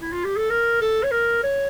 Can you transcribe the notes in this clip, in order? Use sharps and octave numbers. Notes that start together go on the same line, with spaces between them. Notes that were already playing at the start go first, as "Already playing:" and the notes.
E4
F4
G4
A4
A#4
A4
C#5
A#4
C#5